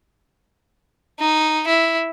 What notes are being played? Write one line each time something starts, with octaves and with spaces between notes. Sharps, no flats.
D#4
E4